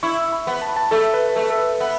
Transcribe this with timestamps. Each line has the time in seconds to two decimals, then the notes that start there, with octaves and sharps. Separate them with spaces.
0.03 E4 C#6
0.32 B5
0.47 B3
0.62 A5
0.70 B5
0.76 A5
0.91 A3 A4
1.14 B4
1.36 A3 A4
1.50 A4
1.58 B4
1.80 B3 E5